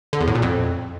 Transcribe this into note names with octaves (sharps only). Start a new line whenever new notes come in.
D3
E2
A2
A#2
F2